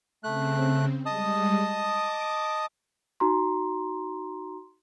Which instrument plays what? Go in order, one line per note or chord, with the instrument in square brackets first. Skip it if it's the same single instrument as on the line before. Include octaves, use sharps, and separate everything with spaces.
[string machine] C#3 C4 [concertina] A3 F#6
[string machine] G3 G#3 [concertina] D#5 A5 D#6
[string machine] D6
[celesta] D#4 F#4 A#5 C6